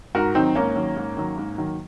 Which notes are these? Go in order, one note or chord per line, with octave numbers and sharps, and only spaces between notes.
G#2 F#4 A#4
D#3 F#3 C4 D#4
G#2 A#3 C#4
D#3 F#3
G#2
D#3 F#3
G#2
D#3 F#3